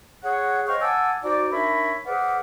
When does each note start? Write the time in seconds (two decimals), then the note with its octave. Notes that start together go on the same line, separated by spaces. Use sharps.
0.24 G#4 C#5 F#5
0.67 C5 C#5 D#5 F5 G5 C#6
0.81 F#5 G#5 A5 D6 E6
1.23 D#4 F#4 C5 D5
1.52 D4 D#4 A#4 C#5 E5 B5
2.06 G#4 B4 C5 D5 F5 F#5